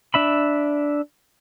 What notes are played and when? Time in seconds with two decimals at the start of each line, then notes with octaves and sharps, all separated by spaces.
0.14 D4 E5 B5